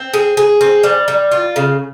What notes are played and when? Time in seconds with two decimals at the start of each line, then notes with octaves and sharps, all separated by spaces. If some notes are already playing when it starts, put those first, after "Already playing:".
Already playing: C4
0.13 G#4
0.37 G#4
0.61 C4
0.83 G3
1.08 G3
1.31 F4
1.56 C#3